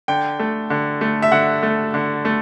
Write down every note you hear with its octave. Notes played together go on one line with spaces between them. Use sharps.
D3 G5
A3
D3
A3
E5
D3 F#5
A3
D3
A3